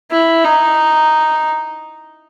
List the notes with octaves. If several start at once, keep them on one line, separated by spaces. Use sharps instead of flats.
E4
D#4